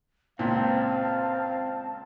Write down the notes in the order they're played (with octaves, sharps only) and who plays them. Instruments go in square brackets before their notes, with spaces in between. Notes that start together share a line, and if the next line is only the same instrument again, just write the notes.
[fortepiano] C#2 A#2 [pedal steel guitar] C4 [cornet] F5 [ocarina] A5